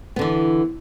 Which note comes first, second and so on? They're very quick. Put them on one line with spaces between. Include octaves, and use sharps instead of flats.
B3 D3 E3